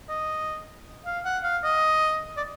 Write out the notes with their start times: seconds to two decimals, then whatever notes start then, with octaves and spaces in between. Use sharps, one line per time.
0.09 D#5
1.06 F5
1.25 F#5
1.44 F5
1.64 D#5
2.37 D5